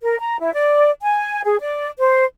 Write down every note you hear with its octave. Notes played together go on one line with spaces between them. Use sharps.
A#4
A#5
E4
D5
G#5
G#4
D5
C5